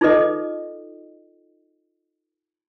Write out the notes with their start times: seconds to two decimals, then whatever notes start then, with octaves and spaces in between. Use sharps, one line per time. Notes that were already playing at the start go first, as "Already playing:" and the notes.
0.01 D#4 F4 G#4 A4 B4 D#5